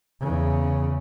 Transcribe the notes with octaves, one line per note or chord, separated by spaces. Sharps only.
E2 C#3